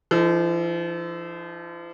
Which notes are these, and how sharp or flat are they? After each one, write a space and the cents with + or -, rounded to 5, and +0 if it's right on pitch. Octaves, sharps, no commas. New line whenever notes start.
F3 -40 D#4 +5 A4 +0